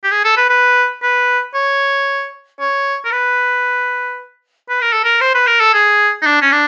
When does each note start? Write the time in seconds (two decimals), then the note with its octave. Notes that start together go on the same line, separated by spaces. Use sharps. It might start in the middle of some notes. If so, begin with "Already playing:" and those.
0.04 G4
0.11 G#4
0.25 A4
0.37 B4
0.50 B4
1.03 B4
1.54 C#5
2.60 C#5
3.05 A#4
3.12 B4
4.69 B4
4.81 A#4
4.93 A4
5.04 A#4
5.21 C5
5.35 B4
5.47 A#4
5.61 A4
5.74 G#4
6.22 D#4
6.26 D4
6.42 C#4
6.52 D4